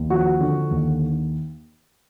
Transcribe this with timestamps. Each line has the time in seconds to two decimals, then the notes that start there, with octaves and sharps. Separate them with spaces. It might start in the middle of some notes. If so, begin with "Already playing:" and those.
Already playing: D#2
0.10 F3 F#4
0.40 D3
0.71 D#2